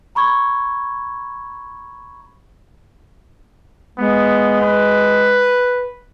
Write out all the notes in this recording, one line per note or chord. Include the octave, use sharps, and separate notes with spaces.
A#5 B5 C#6 G#6
G#3 B3
B4